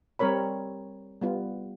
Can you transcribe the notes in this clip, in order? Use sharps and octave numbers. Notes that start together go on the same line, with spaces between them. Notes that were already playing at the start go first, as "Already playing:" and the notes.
G3 C4 A#4 C#5 B5
G3 B3 F4